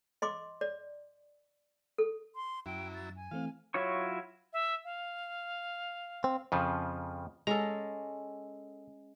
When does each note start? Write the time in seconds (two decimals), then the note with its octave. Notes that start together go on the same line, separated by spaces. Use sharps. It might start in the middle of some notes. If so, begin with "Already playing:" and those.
0.22 D#5 C6 D6
0.61 D5
1.98 A4
2.35 C6
2.66 F#2 F#3 E4 G5
2.94 A6
3.16 G#5
3.31 E3 A3 C4 F5
3.74 F#3 E4 F4 C#5 C#6
4.53 E5
4.85 F5
6.24 C4
6.52 F2 C#3 F3
7.47 G#3 C#4 A4 A#5